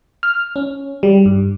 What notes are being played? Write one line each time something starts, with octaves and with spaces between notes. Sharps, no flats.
F6
C#4
G3
G2